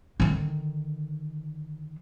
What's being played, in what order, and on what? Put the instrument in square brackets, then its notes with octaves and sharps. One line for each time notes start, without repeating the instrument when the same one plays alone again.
[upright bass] D3 D#3